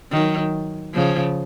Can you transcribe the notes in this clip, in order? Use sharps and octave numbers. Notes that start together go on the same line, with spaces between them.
D#3 F#3
C#3 F3